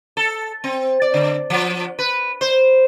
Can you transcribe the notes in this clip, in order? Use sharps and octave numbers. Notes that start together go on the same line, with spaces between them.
A4
C4
D5
D3
F3
B4
C5